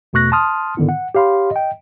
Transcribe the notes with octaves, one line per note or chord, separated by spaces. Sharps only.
E2 B2 A3 C#6 F#6 A#6
A5 C6 D#6 F6
G#2 D3 D#3 B3 E4
F#5
G4 C#5 F5 B5 C6
D#5 G5